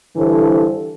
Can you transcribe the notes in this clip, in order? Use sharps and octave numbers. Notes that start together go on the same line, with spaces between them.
G2 D3 E3 A4 C5